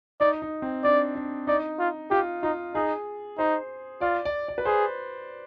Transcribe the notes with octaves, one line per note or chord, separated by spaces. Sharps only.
D#4 D5
D#4
C4
D4 D5
D4
D#4 D5
F4
F4 G4
D#4 F4
D#4 G#4
D#4 C5
F4 D5
D5
D5
B4
G#4 C5